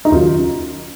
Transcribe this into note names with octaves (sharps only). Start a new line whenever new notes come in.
D#4
D#2 C#3 F#3 F4